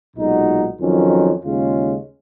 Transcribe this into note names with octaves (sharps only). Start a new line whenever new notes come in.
B1 A#2 G#3 D#4 F#4
F2 D#3 F#3 C#4
D#2 C#3 G#3 C#4 F4